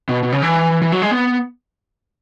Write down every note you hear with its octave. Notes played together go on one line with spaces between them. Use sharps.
B2
B2
C#3
E3
E3
F#3
G#3
B3